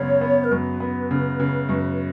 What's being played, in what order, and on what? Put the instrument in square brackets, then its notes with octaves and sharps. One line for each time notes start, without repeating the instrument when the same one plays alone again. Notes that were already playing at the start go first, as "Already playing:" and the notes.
Already playing: [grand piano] F#2 C#3 G#3 B3 [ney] C#5
[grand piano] B3
[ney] A#4
[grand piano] F#2 [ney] B4
[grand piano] B3
C#3
C#3
F#2